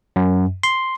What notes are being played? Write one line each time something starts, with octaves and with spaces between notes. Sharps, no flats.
F#2
C6